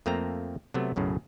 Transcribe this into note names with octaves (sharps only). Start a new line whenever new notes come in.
F2 A3 A#3 C4 A#5
C3 F#3 A3 B3
B1 F#2 A2 C#3